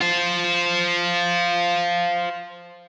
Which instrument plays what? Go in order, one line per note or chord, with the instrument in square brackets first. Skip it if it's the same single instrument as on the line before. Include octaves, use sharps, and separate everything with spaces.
[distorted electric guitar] F4 C5